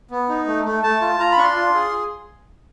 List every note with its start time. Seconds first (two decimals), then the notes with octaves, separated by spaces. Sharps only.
0.11 B3
0.29 D#4
0.47 A3
0.65 A3
0.83 A3 A5
1.01 F4
1.19 F4 A#5
1.32 B5
1.38 D4 C#6
1.43 C6
1.56 F4
1.74 G#4